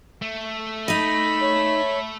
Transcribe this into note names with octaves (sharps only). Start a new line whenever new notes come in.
A3
D#4 D#5 B5
C#5